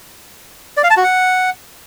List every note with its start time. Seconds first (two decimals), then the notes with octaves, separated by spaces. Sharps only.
0.77 D5
0.84 F5
0.90 A5
0.97 F#4
1.04 F#5